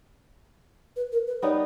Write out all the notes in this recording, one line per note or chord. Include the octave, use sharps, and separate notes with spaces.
B4
A#4
B4
G3 B3 D#4 C#5